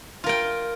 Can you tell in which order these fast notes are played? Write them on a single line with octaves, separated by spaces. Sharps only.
F4 A#4 G5